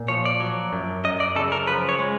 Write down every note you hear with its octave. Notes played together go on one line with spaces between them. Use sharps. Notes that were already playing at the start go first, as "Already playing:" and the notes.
Already playing: A#2
F3 C#5
D5
F#3
F#2
F#2 D#5
D5
C#3 A4
A#4
F3 B4
C#5
G#3